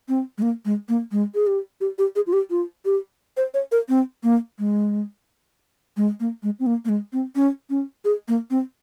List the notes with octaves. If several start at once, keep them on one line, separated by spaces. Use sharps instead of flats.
C4
G#3
A#3
G#3
A#3
G#3
G#4
G4
G4
G4
G#4
F4
G4
F4
G4
C5
C#5
A#4
C4
A#3
G#3
G#3
A#3
G#3
C4
A#3
A#3
G#3
C4
C#4
C#4
G#4
A#3
C4